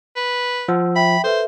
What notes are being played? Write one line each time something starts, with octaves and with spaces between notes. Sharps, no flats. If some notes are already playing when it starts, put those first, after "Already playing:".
B4
F3 F#5 E6
E5 G5 B5
A4 B4 C5 E5